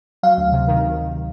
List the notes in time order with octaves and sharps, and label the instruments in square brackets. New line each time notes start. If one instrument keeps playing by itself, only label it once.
[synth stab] F#3 [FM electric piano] F5
[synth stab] D2
C3
D#3